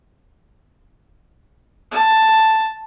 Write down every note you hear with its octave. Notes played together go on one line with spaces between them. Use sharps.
A5